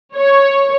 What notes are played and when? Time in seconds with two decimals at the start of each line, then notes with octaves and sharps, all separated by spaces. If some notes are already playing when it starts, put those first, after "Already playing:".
0.16 C#5